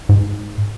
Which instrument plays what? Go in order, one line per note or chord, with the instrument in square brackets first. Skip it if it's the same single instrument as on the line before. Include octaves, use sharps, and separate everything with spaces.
[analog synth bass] G#2